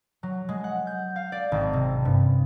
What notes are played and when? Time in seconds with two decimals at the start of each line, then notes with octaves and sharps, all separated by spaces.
0.23 F#3
0.49 G#3
0.64 F#5
0.87 G6
1.16 F5
1.32 D5
1.52 G#1
1.73 C3
2.05 G2